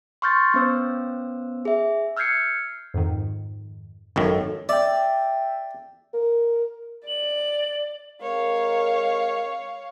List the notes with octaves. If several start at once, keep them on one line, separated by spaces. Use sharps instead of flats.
C6 C#6 F6 G6 A6
B3 C#4 C5 E6
G#4 E5
E6 F6 G6 G#6 C7 C#7
F2 G#2 D#3
G#1 F#2 D#3 A4 C#5
D5 E5 G5
A#4
D5 F#7
G#3 C4 A#4 C#5 F5